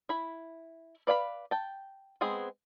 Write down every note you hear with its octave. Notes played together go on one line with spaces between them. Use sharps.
E4 B5
B4 D5 F5 G#5 B5
G5 A5
G#3 B3 C4 G#4